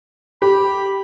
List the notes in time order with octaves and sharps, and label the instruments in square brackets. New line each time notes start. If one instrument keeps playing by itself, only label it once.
[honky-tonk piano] G4 [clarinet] B5